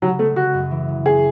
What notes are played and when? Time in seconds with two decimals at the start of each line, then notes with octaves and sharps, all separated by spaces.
0.02 C#3 F#3
0.19 G#3 A3
0.36 C#3 F#4
0.54 F#2
0.71 E3
0.88 C#3
1.06 C#4 G#4